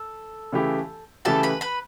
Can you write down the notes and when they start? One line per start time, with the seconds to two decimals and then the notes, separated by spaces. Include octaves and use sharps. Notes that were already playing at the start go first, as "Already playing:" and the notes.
Already playing: A4
0.52 C#3 E3 A3 E4 G4
1.25 C#3 E3 A3 E4 G4 A4 A5
1.43 B4 B5
1.61 B4 B5